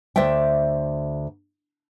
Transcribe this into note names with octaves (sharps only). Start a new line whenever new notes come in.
D2 C5 D5 E5 G5